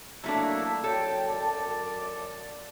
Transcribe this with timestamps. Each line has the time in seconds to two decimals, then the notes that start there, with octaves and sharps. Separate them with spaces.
0.24 F#3 A3 A#3 D4 E4
0.84 F#3 A4 G5
1.28 F#2 D5